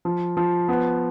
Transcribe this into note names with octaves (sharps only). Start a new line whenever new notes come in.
F3
F3
B3